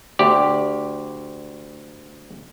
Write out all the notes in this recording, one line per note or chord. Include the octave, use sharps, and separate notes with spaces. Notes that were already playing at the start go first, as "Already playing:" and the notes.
D2 G4 D5